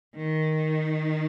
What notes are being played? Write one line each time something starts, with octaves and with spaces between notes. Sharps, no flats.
D#3